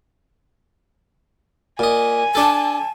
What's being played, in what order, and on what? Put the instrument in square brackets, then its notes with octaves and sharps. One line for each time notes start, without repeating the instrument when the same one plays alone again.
[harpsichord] A#2 D#5 [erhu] G#5
[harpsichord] D4 A4 [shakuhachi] A5